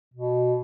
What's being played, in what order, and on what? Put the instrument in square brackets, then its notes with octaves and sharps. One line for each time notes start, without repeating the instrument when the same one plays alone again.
[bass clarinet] B2